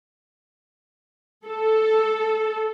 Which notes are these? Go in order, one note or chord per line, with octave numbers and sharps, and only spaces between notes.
A4